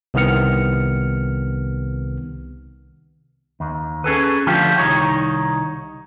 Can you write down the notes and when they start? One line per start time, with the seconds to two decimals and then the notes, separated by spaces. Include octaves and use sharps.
0.14 C2 C3 D#3 B3 F6 C#7
3.60 D#2
4.04 C#4 G#4 A4 B4
4.47 D3 F3 A3 F4 G4
4.78 C2 D#3 D#4 C#5